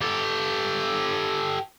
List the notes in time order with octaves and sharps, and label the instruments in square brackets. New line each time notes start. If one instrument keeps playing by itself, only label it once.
[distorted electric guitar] G4 A4